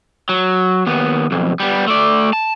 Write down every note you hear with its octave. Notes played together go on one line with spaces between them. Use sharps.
F#3
D#2 B3
B1 F2
G3 B3
A3 D5
A5